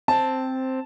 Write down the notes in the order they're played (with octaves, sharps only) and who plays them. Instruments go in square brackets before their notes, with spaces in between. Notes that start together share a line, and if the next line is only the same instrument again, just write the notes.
[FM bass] C4 [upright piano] A5